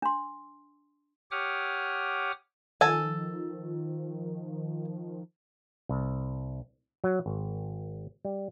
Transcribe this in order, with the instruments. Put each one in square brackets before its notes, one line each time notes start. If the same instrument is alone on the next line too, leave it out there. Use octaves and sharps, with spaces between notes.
[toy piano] D4 C6
[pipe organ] G4 C#5 F#5 D6 D#6 F6
[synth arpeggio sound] D#3 F3 [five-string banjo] A4 G#5
[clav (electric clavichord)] C2
F#3
G#1
G3